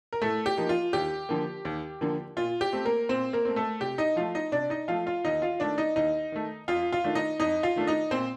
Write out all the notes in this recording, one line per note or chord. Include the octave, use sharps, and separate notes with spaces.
A#4
A2 A3 A4
G4
F3 A#3 D#4
F4
D#2 G4
D3 F3 A#3
D#2
D3 F3 A#3
A#2 F4
G4
A3 C4
A#3 A#4
A#2 C4 C5
A#3 A#4
A3 C4
A3 A4
C3 G4
D#4 D#5
F3 A3 F4 F5
D#4 D#5
C3 D4 D5
D#4 D#5
F3 A3 F4 F5
F4 F5
D#2 D#4 D#5
F4 F5
D#3 A3 D4 D5
D#4 D#5
D#2 D#4 D#5
D#3 A3
F2 F4 F5
F4 F5
D#3 A3 D4
D#4 D#5
F2 D#4 D#5
F4 F5
D#3 A3 D4
D#4 D#5
A#2 C4 C5